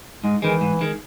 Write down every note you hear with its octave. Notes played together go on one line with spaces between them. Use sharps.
G#2 G#3
D#3 E3 G#3
G#2
D#3 G#3